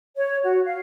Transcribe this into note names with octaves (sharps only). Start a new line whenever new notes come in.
C#5
F#4
F5